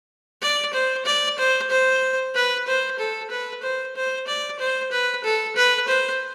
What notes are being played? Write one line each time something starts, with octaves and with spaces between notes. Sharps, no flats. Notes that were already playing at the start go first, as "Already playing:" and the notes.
D5
C5
D5
C5
C5
B4
C5
A4
B4
C5
C5
D5
C5
B4
A4
B4
C5